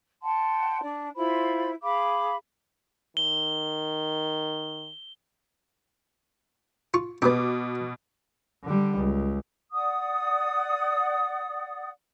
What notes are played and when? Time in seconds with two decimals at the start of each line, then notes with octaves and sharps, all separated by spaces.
0.23 F#5 G5 A5 C6
0.81 D4 D5
1.16 E4 F4 C5 B5
1.82 G#4 F5 B5 D6
3.17 D#3 G7
6.94 F4 C#6
7.22 B2 B3 G4 D6
8.64 D3 G3
8.97 C#2
9.73 D5 F#5 D#6